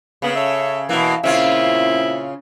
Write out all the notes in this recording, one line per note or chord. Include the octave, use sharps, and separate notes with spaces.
C#3 A#3 B3
A4 C#5 E5
B2 E3 A#3
A#2 C#3 C4 C#4 E4 F4